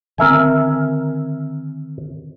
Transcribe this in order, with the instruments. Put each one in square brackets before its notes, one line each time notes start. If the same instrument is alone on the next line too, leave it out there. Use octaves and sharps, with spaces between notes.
[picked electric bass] D3 D#3 C4 [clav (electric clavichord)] A#4 E5 G#5